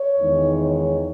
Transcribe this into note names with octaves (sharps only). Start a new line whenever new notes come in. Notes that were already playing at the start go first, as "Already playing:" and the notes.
Already playing: C#5
E2 D#3 G#3 D#4
C#5